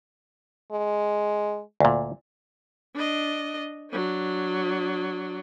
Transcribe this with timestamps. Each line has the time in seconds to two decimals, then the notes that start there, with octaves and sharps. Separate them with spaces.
0.72 G#3
1.80 D2 A#2
2.95 D4 D#5
3.91 F#3 D4